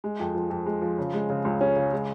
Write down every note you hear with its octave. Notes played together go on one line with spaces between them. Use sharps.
G#3
F2
F3
F2
G#3
F3
C#3
G#3
C#3
C#2
C#4
C#3
G#3